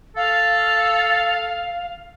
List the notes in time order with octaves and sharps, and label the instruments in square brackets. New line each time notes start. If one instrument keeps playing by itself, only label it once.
[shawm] A4 [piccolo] F5